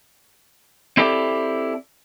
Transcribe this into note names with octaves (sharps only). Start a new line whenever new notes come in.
C4 E4 G4 A4 D5